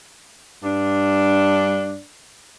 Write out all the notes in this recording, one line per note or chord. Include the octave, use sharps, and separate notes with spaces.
G2 D4